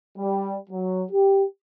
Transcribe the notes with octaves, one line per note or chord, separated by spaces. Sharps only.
G3
F#3
G4